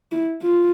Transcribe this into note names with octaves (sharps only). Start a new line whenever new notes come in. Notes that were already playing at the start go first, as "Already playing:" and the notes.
E4
F4